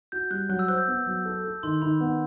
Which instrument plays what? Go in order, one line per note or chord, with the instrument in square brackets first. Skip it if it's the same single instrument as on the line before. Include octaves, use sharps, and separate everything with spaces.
[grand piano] F#4 [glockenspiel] G6
[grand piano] G3 [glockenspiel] F#6
[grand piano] F#3 [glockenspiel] F#6
[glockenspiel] E6
[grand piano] C5 [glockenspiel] F#6
[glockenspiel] G6
[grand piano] B3
F#3
A4
A4
[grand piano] D#3 [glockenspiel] C6
[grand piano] D#3 [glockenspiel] B5
[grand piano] B3